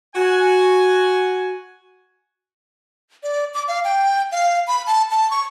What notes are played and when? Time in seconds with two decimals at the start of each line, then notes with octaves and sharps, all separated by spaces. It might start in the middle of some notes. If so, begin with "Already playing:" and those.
0.15 F#4 G#5
3.23 D5
3.54 D6
3.68 F5
3.84 G5
4.32 F5
4.67 B5
4.87 A5
5.11 A5
5.31 C#6